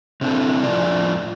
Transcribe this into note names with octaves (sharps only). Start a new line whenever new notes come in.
C3 C4 D4 E4 A4
F2 A2 F3 D4 F4 D5